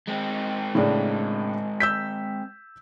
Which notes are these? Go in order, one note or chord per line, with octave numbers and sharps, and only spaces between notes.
G#3 C4
A2 C#3 D4
E6 G6 B6